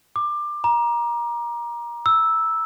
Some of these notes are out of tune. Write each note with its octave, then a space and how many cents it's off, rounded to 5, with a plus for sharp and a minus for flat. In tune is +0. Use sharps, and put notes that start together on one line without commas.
D6 +20
A#5 +25
E6 -5